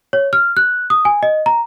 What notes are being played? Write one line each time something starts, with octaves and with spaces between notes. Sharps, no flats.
C#5
F6
F#6
D#6
G#5
D#5
A#5